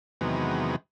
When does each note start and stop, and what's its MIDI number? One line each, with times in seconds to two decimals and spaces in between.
0.21 0.76 40
0.21 0.76 48
0.21 0.76 51
0.21 0.76 54
0.21 0.76 56
0.21 0.76 59